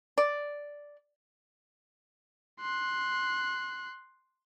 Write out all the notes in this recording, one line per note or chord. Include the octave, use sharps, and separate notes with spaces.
D5
C6 F#6